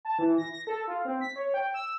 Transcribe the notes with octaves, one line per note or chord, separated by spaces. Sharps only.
A5
E3
A#6
A#6
A4
F4
C4
B6
C#5
G5
E6